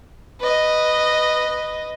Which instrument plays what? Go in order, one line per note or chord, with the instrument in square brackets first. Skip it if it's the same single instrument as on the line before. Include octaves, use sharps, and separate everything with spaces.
[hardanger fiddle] B4 D#5